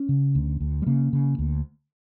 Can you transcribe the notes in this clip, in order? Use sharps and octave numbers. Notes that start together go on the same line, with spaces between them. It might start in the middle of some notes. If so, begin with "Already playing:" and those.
Already playing: C#4
C#3
D2
D2
G3
C#3 A#3
C#3
D2